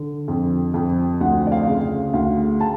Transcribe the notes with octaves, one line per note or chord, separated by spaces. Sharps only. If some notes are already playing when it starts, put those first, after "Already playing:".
Already playing: D3
F2
F2
D2 F#5
D5
F5
C#3
D2 F5
A5